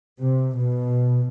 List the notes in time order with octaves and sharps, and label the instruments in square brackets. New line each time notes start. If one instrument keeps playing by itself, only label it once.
[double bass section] C3
B2